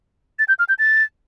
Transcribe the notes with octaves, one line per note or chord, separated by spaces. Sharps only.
A6
G6
F6
G6
A6